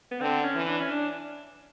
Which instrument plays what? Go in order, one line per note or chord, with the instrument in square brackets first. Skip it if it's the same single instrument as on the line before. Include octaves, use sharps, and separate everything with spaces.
[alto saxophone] B3
[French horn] D3 [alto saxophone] C4
[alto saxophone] C#4
[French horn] E3
[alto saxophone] D4
C#4
D4